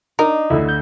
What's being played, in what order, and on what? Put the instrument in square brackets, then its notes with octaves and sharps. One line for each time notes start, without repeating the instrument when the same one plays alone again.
[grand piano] D4 [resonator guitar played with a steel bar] D#4 [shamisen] A#4
[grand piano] D2 D3 [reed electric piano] E4
[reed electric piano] G6